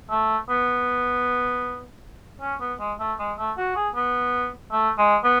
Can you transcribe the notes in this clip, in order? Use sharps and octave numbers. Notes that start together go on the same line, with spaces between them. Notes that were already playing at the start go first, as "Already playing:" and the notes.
A3
B3
C#4
B3
G#3
A3
G#3
A3
F#4
G#4
B3
A3
G#3
B3